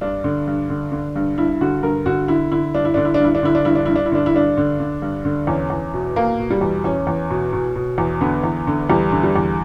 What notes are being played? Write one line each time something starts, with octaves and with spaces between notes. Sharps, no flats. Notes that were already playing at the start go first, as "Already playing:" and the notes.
G2 D4
D3
G2
D3
D3
G2
G2 E4
D3 F#4
G2 A#4
D3 F#4
D3 E4
D3 E4
G2 D4
E4
D3 D4
E4
D4
G2 E4
D4
D3 E4
D4
G2 E4
D4
G2 E4
D4
E4
D3 D4
E4
G2 D4
D3
D3
G2
D3
E2 C#4
E2
B2
B2 A#3
B2
G3
E2
E2 C#4
E2
B2
B2
B2
E2
D3 B3
E2
D3
E2 G3
D3
G3
E2